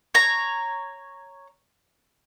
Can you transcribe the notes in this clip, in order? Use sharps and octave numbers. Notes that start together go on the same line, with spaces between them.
C#5 A#5